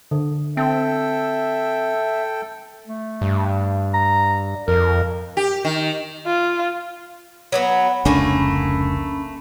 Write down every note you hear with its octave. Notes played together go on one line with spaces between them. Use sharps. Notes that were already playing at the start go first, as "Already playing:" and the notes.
D3
C4 A4 E5 G5
A3
G2
A#5
F2 A#4
G4
D#3
F4
F#3 A#3 B3
F1 C#2 A3 A#3 C#4 D4 G#5 B5